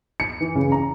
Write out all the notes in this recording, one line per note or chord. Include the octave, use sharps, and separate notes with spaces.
C#7
E3
C#3
A#5